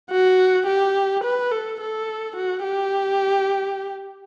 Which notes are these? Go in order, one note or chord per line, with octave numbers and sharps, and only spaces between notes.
F#4
G4
B4
A4
A4
F#4
G4